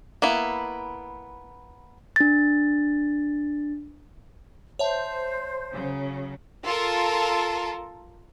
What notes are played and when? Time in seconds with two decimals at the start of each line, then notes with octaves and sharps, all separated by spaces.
0.22 A#3 B3 E4
2.16 D4 A6
4.79 C5 C#5 E5 A5
5.73 C#3 F#3
6.64 F4 A4 A#4